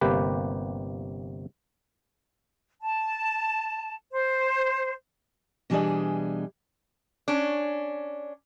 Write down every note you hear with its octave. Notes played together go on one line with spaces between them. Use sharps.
G1 C3 A#3 G4 B4
A5
C5
B2 E3 G3 D4 G#4 D#5
C#4 D4